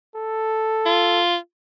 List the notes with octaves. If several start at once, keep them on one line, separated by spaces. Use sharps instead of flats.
A4
F4